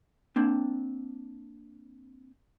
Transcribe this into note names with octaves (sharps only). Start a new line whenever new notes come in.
A#3 C4 D4